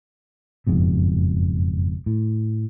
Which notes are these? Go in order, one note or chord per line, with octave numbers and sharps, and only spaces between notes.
F#1 F2 G#2 B2
A2